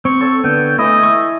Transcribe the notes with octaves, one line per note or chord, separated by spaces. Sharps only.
C4 C#6
A4 C#5
D3 B3 G5
E3 A3 E4 D#5
C#6 E6